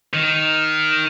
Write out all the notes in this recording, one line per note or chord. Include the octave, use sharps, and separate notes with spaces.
D#3